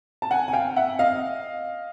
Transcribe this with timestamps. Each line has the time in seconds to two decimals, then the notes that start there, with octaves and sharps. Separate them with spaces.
0.22 A5
0.31 F#5 G#5
0.48 G#5
0.53 F5 G5
0.76 E5 F#5
0.99 D#5 F5